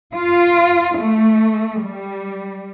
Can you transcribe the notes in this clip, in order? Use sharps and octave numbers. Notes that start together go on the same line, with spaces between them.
F4
A3
G3